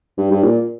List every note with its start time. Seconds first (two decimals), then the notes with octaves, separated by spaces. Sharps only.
0.17 G2
0.31 G2
0.43 A#2